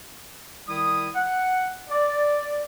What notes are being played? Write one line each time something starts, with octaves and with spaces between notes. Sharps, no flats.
D#3 G3 E4 D#6
F#5
D5